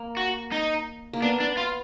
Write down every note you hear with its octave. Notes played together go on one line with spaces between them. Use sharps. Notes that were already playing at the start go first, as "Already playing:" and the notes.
Already playing: A#3
F#4
D#4
A#3
B3 D4
D4
F4